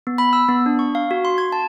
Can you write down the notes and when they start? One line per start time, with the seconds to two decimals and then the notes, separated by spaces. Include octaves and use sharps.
0.07 B3
0.18 B5
0.33 E6
0.49 B3
0.66 D4
0.79 C#6
0.95 F5
1.11 F#4
1.25 C6
1.38 G#6
1.52 A5